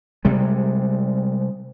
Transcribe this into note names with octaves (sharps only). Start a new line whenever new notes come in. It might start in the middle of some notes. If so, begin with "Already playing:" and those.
C3 G3 G#3